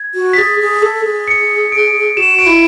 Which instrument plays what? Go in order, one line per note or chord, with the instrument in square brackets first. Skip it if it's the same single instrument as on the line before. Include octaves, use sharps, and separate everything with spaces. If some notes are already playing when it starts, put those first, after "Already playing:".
Already playing: [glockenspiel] G#6
[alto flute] F#4
[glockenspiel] B6
[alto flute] G#4 [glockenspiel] A6
[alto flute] G#4
A4
G#4
[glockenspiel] C#7
D7
[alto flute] F#4 [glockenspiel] E7
[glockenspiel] D7
[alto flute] E4